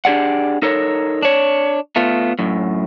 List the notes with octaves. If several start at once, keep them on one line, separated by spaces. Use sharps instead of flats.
D4 G4 G#4 D5 F#5
D#4 A4 A#4 C#5
D4 C#5
A3 B3 F4
F#2 A2